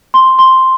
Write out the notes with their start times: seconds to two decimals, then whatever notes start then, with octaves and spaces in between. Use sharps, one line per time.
0.14 C6
0.39 C6